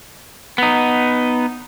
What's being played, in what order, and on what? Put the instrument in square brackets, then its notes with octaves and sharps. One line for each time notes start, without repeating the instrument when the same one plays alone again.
[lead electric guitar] B3 D#4